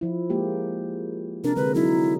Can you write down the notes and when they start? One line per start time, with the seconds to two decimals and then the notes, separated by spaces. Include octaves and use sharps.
0.01 F3 E4
0.30 G#3 A#3 G4
1.44 C3 D4 A#4
1.56 D3 G#3 B4
1.75 F#3 D#4 E4